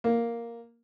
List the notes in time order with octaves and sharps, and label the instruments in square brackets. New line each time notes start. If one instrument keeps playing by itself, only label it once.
[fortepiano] A#3